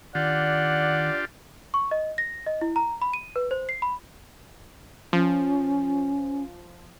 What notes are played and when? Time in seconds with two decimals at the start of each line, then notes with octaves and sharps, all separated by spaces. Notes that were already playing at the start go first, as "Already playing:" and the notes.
0.15 D#3 D4 F4 G4 D5 F#5
1.74 C#6
1.91 D#5
2.18 A#6
2.46 D#5
2.61 E4
2.76 A#5
3.02 B5
3.13 D#7
3.36 B4
3.51 C5
3.69 C7
3.82 B5
5.13 F3 C#4